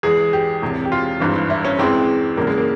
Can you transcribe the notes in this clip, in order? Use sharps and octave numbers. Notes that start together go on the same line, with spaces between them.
E2 E3 G#3 G#4
G4
E1 E2 C3
G4
F4
G#1 G2 E3
E4
C#4
E2 E3 G#3 C4
E1 E2 C#3 A#3
G#3
A#3